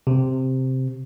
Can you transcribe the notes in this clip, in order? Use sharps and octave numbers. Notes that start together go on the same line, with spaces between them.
C3